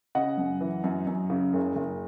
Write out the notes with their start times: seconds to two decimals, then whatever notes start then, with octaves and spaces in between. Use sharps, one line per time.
0.15 C#3 D#5 F#5
0.38 F#2
0.61 E3
0.84 F#2
1.07 F#2
1.30 C#3
1.53 F#1
1.75 F#1